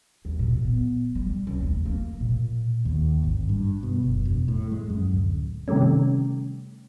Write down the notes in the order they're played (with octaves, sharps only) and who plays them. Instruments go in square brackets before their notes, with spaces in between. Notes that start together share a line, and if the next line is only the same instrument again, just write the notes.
[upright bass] D#2
A#2
B3
G3
C#2
D#2
A#3
A#2
[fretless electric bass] D#2
G#1
G2
B2
F#1
E1
A2
G#3
F#2
D1
[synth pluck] C3 D#3 G3 A3 C#4